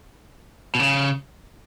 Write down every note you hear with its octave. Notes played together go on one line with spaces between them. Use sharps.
B2
C#3